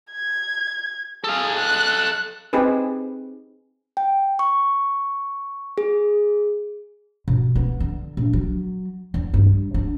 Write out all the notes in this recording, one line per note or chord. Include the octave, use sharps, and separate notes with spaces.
G#6
G#4 A4 F5
F#6
C4 D#4 G4 G#4 B4
G5
C#6
G#4
B2
B3
D3
A#1
F#3
E2
G2
D4